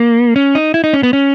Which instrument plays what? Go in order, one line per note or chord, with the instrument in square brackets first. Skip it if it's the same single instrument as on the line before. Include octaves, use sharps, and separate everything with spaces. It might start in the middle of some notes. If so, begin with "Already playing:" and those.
Already playing: [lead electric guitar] A#3
C#4
D#4
E4
D#4
C#4
B3
C#4